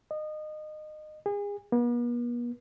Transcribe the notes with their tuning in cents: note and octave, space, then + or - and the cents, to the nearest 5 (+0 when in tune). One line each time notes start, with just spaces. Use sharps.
D#5 -25
G#4 -35
B3 -45